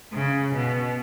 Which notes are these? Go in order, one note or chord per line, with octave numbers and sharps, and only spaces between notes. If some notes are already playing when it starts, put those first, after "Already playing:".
C#3
B2